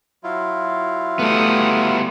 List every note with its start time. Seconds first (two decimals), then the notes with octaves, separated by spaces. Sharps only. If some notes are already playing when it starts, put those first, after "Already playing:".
0.24 F#3 E4 F4
1.19 G3 A3 B3 D#6